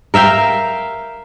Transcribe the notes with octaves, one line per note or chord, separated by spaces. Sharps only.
A#4 E5 F5 G5